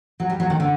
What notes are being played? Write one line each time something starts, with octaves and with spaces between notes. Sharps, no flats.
F#3
G3
F#3
D#3
D3